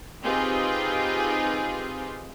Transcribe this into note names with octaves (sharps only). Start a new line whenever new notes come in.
C4 D#4 F4 G4 G#4 B4